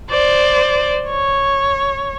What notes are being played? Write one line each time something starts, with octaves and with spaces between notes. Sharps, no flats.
C5 D5
C#5